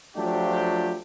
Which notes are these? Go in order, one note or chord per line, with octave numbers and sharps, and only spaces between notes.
F3 F#3 A3 D4 F4 G4